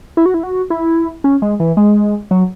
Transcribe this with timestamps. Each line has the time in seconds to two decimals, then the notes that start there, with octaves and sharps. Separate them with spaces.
0.17 E4
0.26 F#4
0.34 E4
0.43 F#4
0.70 E4
1.24 C#4
1.42 G#3
1.60 E3
1.77 G#3
2.31 F#3